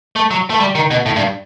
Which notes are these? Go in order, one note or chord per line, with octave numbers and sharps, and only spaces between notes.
A3
F#3
A3
G3
D#3
B2
A2
G2